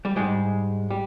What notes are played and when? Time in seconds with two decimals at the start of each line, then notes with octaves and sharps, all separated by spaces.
0.05 G3
0.16 G#2 G3 G#3
0.90 G3